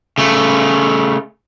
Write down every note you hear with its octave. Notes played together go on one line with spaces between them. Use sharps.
C#3 A3